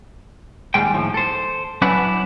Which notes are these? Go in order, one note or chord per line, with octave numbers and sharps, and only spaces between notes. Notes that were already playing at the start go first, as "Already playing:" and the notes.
D#2 A#2 G3 G#3 G5
D#2 A2 F3
A4 C5
F#3 C#4 D4 E4 B4 F#5